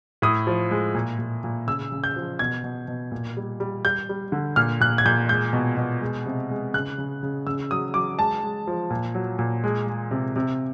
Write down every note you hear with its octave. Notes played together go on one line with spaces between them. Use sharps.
A2 D#6
F3
G#3
A#2
A#2
A#2
C#3 E6
C#3
G6
F3
B2 G#6
B2
B2
A#2
G3
G3
G3 G6
G3
D3
A#2 F6
A#2 F#6
G#6
A#2 G6
G#3 G6
B2
B2
G#3
C3
G#3
C#3 F#6
C#3
C#3
C#3 E6
F#3 D#6
F#3 D6
G#3 A5
G#3
F3
A#2
F#3
A#2
G#3
G#3
C3
C3